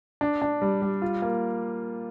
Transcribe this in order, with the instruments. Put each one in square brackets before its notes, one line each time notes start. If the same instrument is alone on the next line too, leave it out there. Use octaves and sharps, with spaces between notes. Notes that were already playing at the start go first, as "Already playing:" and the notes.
[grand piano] D4
D4
G3
G3
F4
A#3